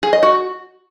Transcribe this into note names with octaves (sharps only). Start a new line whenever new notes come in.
G#4
D#5
F#4